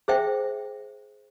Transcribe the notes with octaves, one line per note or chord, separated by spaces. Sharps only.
G#4 C5 E5 G5